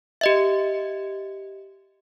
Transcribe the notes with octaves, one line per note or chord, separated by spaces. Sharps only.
G4 D#5 E5